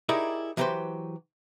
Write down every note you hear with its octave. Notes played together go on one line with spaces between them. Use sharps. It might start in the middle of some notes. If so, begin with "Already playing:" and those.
D#4 E4 G4 G#4 A#4 D5
E3 F#3 G4 A4 B4 C5